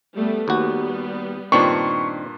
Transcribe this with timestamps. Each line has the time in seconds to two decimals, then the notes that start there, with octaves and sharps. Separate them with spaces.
0.15 G3 A3 B3
0.48 D#2 G3 B3 F#4
1.52 G2 A#2 D#3 C4 D4 C#6